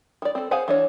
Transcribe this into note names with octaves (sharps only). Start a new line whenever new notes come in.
D#3 D5
C4 A4
G#4 C5 F5 F#5 G#5
E3 D4 C#5